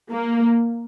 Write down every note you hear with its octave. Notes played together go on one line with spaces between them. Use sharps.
A#3